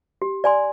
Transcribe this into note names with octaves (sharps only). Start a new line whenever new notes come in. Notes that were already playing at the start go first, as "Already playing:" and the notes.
G4
D5 G#5 C6